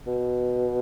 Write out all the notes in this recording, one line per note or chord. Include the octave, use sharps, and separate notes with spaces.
B2